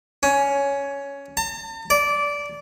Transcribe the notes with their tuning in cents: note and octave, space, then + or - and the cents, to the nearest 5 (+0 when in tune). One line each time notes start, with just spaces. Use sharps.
C#4 +10
A5 +45
D5 -15